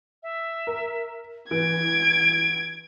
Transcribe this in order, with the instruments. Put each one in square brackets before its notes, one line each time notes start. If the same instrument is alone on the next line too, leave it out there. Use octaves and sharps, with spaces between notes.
[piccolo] E5
[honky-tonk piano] A#4
[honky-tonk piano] E3 [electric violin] G#6 [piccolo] D7